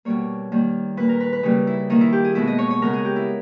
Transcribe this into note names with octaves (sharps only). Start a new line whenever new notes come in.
B2 G3 A#3 C#5
D#3 G3 A#3
A#2 A#3 B4
A#4
B4
B4
C#3 G3 A#3 D#4
E4
D#3 A#3 D#4
E4
G4
G#4
B2 G#3 B3 E4
D#5
C#5
C#5
C#3 G#3 B3 A#4
G#4
G4
E4